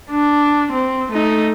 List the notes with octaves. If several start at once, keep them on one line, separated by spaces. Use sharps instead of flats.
D4
C4
A3 D#4